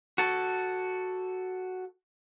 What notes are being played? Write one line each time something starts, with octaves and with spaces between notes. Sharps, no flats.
F#4 A4